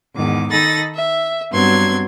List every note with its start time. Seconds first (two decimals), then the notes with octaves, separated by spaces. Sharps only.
0.15 E2 G#2 D#3 D6
0.52 D#3 D#4 A4 B5 A6 A#6
0.94 E5
1.52 G2 F#3 B3 C4 C6 G#6